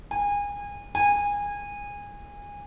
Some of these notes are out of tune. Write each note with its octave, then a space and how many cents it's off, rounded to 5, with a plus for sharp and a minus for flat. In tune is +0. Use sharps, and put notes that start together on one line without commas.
G#5 -30
G#5 -25